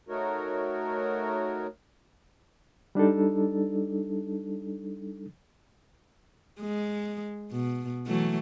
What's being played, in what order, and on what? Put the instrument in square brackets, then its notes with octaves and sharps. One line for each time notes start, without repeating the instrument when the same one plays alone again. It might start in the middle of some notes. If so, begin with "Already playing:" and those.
[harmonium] A3 D#4 F#4 A#4 C#5
[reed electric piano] G3 D4 D#4 A4
[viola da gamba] G#3
B2
E3 F#3 A3